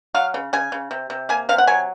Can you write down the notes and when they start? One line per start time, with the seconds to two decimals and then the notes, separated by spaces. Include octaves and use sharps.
0.15 F#3 F5
0.34 C#3
0.53 C#3 G#5
0.72 C#3
0.91 C3
1.10 C3
1.29 A#3 G#5
1.49 C3 F5
1.58 F#5
1.67 F#3 G#5